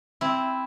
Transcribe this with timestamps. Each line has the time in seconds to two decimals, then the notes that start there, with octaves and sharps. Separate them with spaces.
0.21 C4 E4